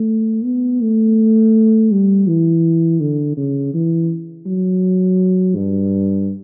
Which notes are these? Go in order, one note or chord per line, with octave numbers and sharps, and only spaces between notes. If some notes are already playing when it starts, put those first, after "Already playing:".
Already playing: A3
B3
A3
G3
E3
D3
C#3
E3
F#3
G2